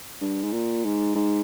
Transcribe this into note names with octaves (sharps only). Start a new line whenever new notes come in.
G2
G#2
A#2
G#2
G#2